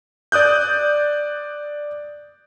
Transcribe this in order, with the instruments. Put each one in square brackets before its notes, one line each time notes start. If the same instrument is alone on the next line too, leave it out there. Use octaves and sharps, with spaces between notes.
[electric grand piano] D5 D#6 F#6 G6